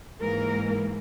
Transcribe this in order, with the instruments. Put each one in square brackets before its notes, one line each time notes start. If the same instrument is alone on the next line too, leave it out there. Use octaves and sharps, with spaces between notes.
[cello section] G#2 E3 A#3 A#4